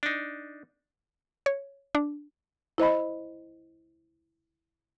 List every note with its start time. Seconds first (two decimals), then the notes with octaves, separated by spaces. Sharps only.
0.03 D4 D#4
1.46 C#5
1.95 D4
2.78 E4 C5 D#5 B5